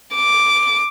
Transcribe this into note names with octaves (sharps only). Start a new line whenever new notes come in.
D6